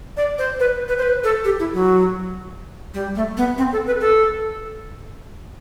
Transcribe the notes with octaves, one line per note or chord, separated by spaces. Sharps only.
D5
C5
B4
B4
C5
B4
A4
G4
E4
F#3
G3
A3
B3
C4
A4
B4
A4